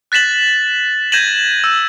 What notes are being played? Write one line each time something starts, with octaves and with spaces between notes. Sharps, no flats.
F#6 A6 B6 E7 F#7
G6 G#6 A#6 D#7 E7 F#7
E6